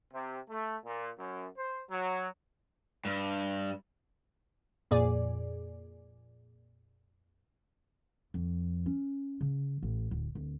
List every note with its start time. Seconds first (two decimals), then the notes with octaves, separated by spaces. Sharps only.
0.13 C3
0.49 A3
0.85 A#2
1.18 F#2
1.57 C5
1.90 F#3
3.05 G2
4.91 F2 A#2 G#4 D5
8.34 F2
8.86 C#4
9.41 C#3
9.82 A1
10.11 D1
10.35 D1